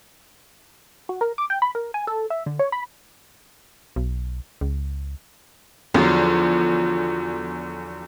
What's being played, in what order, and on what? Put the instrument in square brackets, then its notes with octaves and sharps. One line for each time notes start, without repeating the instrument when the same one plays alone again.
[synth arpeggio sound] F#4
A#4
D6
G5
B5
A#4
G#5
A4
E5
D3
C#5
B5
[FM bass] B1
C#2
[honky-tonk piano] E2 D3 F#3 [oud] F3